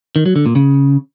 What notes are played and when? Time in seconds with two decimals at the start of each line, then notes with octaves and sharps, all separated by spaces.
0.16 D#3
0.26 F#3
0.36 D3
0.46 A#2
0.56 C#3